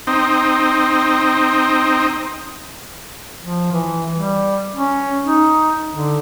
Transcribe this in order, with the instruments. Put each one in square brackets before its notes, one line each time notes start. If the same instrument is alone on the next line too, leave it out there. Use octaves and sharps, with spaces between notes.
[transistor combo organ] C4 D#4
[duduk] F3
E3
G3
C#4
D#4
D3